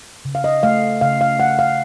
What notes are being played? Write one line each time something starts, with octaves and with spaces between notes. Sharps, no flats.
C#3
F5
D#5
A3 F5
C#3 F5
F5
A3 F#5
F5